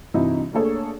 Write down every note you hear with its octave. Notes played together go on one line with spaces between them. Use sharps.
G2 C3 E3 D#4 E4 F#4
A3 A#3 D4 G#4 A4 C#5